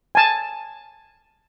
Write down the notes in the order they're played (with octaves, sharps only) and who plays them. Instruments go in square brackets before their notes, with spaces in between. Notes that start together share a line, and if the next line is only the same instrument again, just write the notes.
[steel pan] G#5 A5